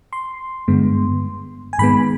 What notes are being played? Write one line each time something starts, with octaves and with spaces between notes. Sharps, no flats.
C6
G2 D3 G#3 B3
G#5
G#2 D#3 G#3 B3 B5